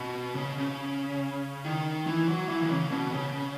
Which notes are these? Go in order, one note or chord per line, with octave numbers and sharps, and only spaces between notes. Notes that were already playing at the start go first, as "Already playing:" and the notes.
Already playing: B2
C#3
C#3
D#3
E3
F#3
E3
D#3
C#3
B2
C#3